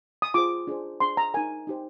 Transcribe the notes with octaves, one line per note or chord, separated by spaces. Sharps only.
D#6
F4 G#4 C5 D6
D4 G#4 C5
D4 G#4 C5 C6
A#5
D#4 A#4 G#5
D#4 G4 C5